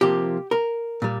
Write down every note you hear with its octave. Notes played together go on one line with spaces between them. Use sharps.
C3 F3 A#3 G4
A#4
A#2 G3